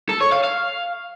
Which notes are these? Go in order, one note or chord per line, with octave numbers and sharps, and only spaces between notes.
A4
C#5
F5
F5